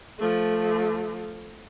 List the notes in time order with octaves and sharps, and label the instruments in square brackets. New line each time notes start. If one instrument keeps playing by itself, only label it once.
[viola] F3 A3